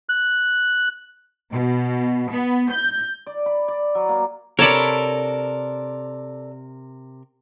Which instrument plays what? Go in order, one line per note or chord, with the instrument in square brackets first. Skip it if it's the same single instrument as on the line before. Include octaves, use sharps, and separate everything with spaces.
[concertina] F#6
[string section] B2
B3
G6
[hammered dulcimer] D5
B5
D5
F#3
A#3
[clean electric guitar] C3 A#4 [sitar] A4 D5 [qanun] C#5 A5 B5